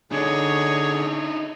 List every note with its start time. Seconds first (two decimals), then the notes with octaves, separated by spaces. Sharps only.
0.12 D3 D4 D#4 G#4 C#5